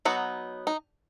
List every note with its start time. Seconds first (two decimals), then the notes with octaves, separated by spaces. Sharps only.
0.05 F#3 B3 D#4 F#4
0.67 D#4